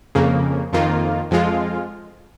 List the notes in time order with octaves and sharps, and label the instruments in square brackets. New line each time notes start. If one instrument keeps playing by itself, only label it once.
[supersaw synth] F2 C#3 A#3
F2 D#3 A#3 F4
F2 F3 G#3 F4